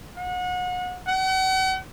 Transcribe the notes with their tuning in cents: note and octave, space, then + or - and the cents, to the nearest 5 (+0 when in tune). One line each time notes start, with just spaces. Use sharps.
F#5 -35
F#5 +40